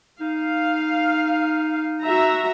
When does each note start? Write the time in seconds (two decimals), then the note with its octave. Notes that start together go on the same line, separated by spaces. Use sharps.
0.21 D#4 F5
2.01 F#4 E5 A#5